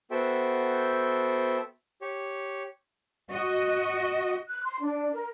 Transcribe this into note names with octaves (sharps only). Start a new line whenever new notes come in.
B3 F#4 A4 C5 E5 G5
G4 C#5
F#4 D#5
F#6
C6
D4
A#4